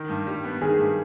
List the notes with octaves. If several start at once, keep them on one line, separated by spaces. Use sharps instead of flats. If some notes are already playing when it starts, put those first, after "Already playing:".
Already playing: D#3
G2
G3
B3
D#3 G#4
G2